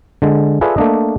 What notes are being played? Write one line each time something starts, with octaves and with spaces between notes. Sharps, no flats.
D3 G#3
F4 G#4 A4 B4 D5 E5
A3 A#3 D4 D#5